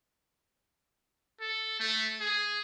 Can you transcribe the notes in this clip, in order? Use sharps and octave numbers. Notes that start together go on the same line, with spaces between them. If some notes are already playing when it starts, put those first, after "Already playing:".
A4
A3
G#4